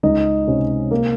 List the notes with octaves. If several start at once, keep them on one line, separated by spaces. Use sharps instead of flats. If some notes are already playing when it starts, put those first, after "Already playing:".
C#2 D#4 D#5
C3 C#4 C#5
A#3 A#4